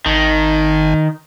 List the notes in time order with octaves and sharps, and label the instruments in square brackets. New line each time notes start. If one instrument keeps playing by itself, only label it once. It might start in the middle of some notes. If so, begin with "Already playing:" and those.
[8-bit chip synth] G#1 [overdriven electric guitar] D#3